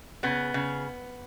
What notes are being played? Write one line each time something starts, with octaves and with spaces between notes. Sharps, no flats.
C#3 B3
C#3